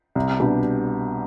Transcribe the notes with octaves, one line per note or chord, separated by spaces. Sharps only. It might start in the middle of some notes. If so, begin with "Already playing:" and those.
C2
B2 G3 D4 G4